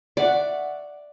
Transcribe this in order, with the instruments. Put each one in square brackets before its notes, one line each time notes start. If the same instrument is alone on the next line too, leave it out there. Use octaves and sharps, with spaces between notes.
[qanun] D5 [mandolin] E5 F#5 C#6